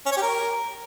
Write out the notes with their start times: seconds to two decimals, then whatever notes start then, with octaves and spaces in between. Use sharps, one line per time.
0.06 C#4
0.12 C#5
0.17 G4
0.22 A#4